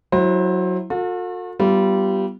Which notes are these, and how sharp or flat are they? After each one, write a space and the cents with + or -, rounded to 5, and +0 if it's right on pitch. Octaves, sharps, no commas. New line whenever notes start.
F#3 +0 E4 +0 C5 +30
F#4 -45 A4 +30
G3 -20 B3 +0 F4 -35